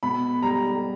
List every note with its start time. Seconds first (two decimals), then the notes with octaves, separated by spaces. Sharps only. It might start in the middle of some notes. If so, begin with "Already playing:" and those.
0.03 B2 B5
0.42 G3 A#5